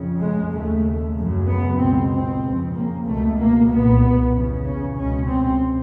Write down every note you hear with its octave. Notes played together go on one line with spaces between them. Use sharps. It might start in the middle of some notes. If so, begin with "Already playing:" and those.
Already playing: F2 C#3
G#3
D#2 C#3 A3
F#2 C#3
B3
C#2 B2 C4
C4
F2 C#3
A#3
C#2 B2 A3
A#3
C2 A#2 B3
E2 C#3
C#4
C#2 B2 C#4
C4